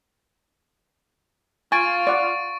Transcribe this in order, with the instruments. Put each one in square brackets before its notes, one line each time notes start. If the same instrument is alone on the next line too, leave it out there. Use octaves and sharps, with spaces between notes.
[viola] F4 F5 [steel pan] G#5 [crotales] C#6 A6 D7
[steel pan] D5 F#5